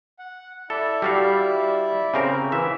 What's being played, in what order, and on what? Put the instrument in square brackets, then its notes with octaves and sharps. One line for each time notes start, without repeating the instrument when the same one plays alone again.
[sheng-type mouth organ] F#5
[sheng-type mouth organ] E4 D5 E5 [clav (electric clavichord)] A4
[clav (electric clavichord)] G3 F#4 F5
C#3 C4 A#4
E3 E5